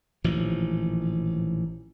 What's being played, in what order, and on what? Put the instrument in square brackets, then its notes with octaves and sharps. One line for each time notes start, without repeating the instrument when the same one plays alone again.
[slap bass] A1 A#2 D#3 F3